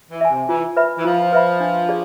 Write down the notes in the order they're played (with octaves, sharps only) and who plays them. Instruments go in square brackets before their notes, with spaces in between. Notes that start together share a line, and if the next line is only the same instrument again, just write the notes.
[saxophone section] E3
[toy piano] E5 G#5
[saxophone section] C3
[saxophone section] E3 [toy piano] F4
[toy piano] B4 E5 B5
[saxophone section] E3
[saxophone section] F3 [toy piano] F4
[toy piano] B4 E5 B5
D4
G#4 D5